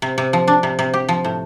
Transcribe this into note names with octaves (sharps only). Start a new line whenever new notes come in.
C3
C3
F3
D4
C3
C3
G4
F3
A2